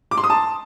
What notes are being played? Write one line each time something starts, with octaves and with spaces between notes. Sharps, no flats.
D6
C6
D#6
A5